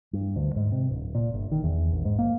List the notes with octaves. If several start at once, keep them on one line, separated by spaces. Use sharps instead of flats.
G2
D2
G#2
C3
D1
A#2
G1
D#3
E2
A#1
G#2
A#3